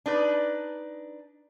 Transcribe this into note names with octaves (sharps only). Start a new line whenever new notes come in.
D4 D#4 B4